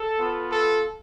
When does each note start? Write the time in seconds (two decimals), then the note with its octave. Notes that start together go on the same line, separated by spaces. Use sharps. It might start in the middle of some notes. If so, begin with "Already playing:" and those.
Already playing: A4
0.19 B3 F4
0.50 A4